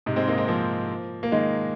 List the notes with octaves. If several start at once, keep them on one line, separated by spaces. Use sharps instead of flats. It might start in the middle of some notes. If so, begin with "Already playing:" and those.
G#2 C3
G#3 C4
A#3 D#4
G#3 C4
F3 A#3
A#3
D#3 G#3